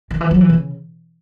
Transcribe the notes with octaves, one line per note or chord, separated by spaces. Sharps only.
D#3
E3
F#3
E3
C#3